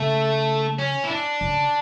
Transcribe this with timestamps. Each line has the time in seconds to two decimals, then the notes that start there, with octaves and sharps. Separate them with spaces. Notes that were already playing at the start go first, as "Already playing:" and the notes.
Already playing: C#3 A3
0.79 C#4
1.04 E4
1.09 D4
1.41 C#3